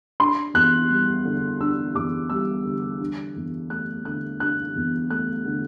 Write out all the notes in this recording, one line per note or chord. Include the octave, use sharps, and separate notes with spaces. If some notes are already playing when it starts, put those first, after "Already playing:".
D4 C6
E2 F#6
G3
D3
D4 E6
E2 D6
G3 E6
D3
D4
E2
A3 F#6
D3 F#6
D4 F#6
E2
A3 F#6
D3